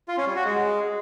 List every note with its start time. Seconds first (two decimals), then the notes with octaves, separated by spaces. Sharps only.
0.08 F4
0.17 C#4
0.26 G3
0.36 F#4
0.45 G#3